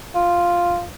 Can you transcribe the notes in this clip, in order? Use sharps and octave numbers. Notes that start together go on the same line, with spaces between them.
F4